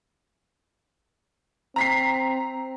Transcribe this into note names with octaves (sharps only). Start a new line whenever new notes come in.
C4 A#5 B6 C7